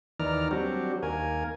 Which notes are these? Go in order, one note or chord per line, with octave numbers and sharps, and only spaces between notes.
D#2 D#3 E3 D5 A#5 F6
F#3 G3 C4 D4 F#4 G4
D#2 A#3 A#4 G#5